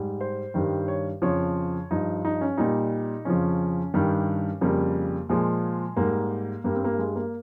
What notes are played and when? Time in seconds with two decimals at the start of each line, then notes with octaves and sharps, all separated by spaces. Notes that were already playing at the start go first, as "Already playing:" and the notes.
Already playing: G#2 G3
0.21 C5
0.54 G2 D#3 G3
0.88 C#5
1.22 F2 C#3 F3 C#5
1.91 G2 F3 D#4
2.25 D#4
2.41 C#4
2.57 A#2 G3 D#4
3.25 F2 C#3 F3 C#4
3.94 G2 D#3 G3
4.61 F2 C#3 G3 A#3
5.29 A#2 F3 G#3
5.97 G#2 G3 A#3
6.64 G2 G3 A#3
6.75 C4
6.84 A#3
6.98 G#3
7.16 A#3